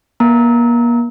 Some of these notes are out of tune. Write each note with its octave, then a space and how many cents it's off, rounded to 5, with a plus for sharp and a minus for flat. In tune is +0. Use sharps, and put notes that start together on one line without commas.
A#3 +35 A#5 +0 E6 -35